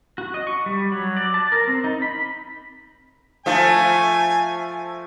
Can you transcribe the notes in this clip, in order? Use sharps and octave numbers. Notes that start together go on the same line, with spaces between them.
F#4
D#5
C#6
G3
F#3
D5
A5
A#4
C4
D#4
B5
F3 A3 F4 G#5